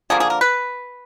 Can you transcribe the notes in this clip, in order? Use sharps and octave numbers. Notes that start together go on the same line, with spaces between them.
D3 F3 A#3 G#4
G#4
A#4
B4